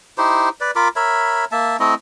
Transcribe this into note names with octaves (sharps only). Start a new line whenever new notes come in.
D#4 E4 G4 C5
B4 D5
F4 A#4 B5 D6
A#4 C#5 E5 B5
A#3 E5 A5
A3 C4 E4 D#5